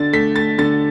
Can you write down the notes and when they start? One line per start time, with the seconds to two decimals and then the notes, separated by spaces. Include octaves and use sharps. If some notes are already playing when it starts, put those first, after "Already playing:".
Already playing: D3 D4 A6
0.13 A3 B6
0.36 A3 A6
0.58 D3 A6